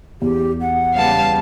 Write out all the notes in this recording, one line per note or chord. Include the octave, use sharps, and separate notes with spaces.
E2 G4
F#5
C#3 G3 B3 F5 A5